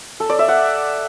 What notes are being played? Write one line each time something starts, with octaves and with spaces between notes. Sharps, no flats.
A4
D5
E5
F#5